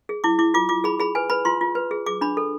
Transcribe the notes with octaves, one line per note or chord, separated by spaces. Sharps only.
G#4
E4 D6
E4 D6
F4 D6
F4 D6
G#4 B5
G#4 B5
B4 G#5
B4 B5
F4 C6
F4
B4
G#4
G#4 D6
D4 B5
A4